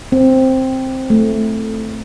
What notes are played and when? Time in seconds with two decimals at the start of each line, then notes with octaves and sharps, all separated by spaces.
0.12 C4
1.10 A3